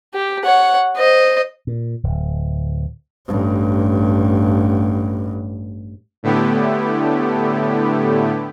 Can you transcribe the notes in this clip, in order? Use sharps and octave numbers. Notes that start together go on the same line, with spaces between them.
G4
C#5 F#5
C5 D#5
A#2
D1
A1 G2
A2 D3 A3 B3 E4 G4